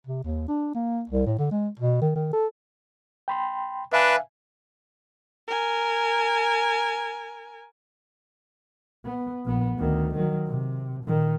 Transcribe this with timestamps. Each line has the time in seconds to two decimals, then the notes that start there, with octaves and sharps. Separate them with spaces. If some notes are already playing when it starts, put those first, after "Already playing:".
0.07 C3
0.24 D#2
0.48 D4
0.75 A#3
1.09 C2
1.26 A2
1.39 D3
1.51 G#3
1.80 B2
2.02 D#3
2.16 D#3
2.33 A4
3.28 G5 B5 C6
3.93 D4 B4 E5 F5 G#5
5.48 A#4 G#5
9.05 B3
9.45 A#1 B3
9.78 D2 D#3
10.15 D#3 F#3
10.47 C3
11.05 A#2 D#3